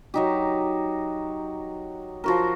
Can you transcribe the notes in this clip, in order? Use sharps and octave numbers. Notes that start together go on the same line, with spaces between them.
F#3 D#4 G4
F3 F#4 A#4